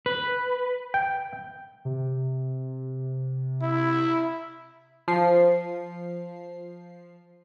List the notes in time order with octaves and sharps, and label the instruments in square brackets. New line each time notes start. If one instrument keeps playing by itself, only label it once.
[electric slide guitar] B4
[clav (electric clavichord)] G5
[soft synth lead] C3
[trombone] E4
[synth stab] F3 C7